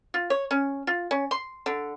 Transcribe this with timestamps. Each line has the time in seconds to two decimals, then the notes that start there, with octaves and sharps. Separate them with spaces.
0.14 F4
0.30 C#5
0.51 C#4
0.87 F4
1.11 C#4
1.31 C6
1.66 D3